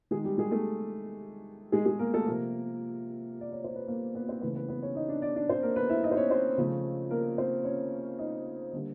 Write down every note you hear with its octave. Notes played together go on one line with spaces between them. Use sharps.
D#3 G#3 G#4
G3 G4
G#3 G#4
A3 A4
G#3 G#4
G#3 G#4
A#3 A#4
A3 A4
C3 F3 A#3 A#4
D5
C#5
C5
B4
A#3 A#4
B3 B4
C4 C5
C#3 E3 A3 B3 B4
B3 B4
B3 B4
C#4 C#5
D#4 D#5
D4 D5
D4 D5
D4 D5
C4 C5
A#3 A#4
B3 B4
E4 E5
D#4 D#5
C5
C#4 C#5
C4 C5
C#3 F3 A3
A#3 A#4
C4 C5
C#4 C#5
D#4 D#5
D3 G3 A#3